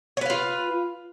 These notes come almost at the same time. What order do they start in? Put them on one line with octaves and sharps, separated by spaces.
C#5 B4 F5 F4